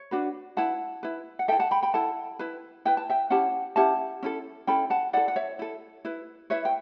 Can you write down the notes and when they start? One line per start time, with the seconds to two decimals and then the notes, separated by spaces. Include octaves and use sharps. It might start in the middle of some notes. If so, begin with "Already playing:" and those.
Already playing: C#5
0.11 D4 F#4 B4
0.57 E4 B4 F#5 A5
1.03 E4 B4
1.39 F#5
1.48 A4 E5 G5
1.52 E4
1.59 F#5 A5
1.71 G5 B5
1.82 G5 B5
1.94 E4 A4 F#5 A5
2.39 E4 B4
2.85 E4 B4 G5
2.97 A5
3.10 E5 G5
3.30 C#4 E4 G4 F#5 A5
3.76 C#4 E4 G4 F#5 A5
4.23 C#4 E4 A4
4.67 C#4 E4 A4 G5 B5
4.90 F#5 A5
5.13 E4 A4 D5 F#5
5.28 F#5
5.36 C#5 E5
5.59 E4 A4
6.05 E4 B4
6.50 E4 B4 C#5 E5
6.65 G5